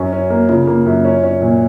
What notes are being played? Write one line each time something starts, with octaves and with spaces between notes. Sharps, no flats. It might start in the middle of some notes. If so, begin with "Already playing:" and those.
Already playing: F#2 C#4 F#4
C#4
A#3
C#3 F4
A#3
F#2
C#4
C#4
A#2